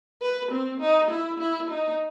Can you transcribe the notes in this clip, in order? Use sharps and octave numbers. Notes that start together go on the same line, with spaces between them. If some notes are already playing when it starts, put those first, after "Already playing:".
B4
C4
D#4
E4
E4
D#4